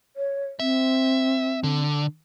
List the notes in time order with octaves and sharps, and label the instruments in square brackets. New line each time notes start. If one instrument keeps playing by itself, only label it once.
[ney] C#5
[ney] C4 [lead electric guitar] E5
[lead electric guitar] D3